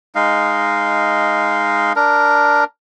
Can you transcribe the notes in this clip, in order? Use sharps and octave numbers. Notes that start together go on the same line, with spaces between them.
G#3 D#4 F5
D4 A#4